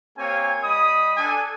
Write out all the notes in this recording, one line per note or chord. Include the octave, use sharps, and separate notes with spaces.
A#3 C4 G4 C#5 F5 G#5
G3 D#5 B5 D#6
D4 A4 G#5